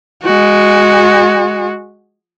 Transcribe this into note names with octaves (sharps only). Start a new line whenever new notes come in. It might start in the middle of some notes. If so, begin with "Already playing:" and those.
G#3 F#4